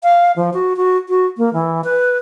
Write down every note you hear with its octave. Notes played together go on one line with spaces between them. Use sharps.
F5
F3
F#4
F#4
F#4
A#3
E3
B4